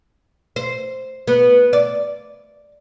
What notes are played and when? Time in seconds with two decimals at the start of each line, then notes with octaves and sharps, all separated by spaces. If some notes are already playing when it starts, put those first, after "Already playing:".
0.56 C5
1.27 B3
1.73 D5